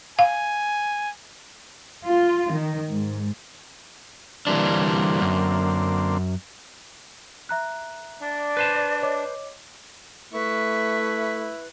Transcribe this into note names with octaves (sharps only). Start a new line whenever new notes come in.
F5 G#5
F4
D#3
G#2
D3 E3 G3 A#3 C4 D4
F#2
E5 A#5 F#6
D4 D5
B4 C5 A5
C#5 D#5 D6
A3 E4 B4 C#6 B6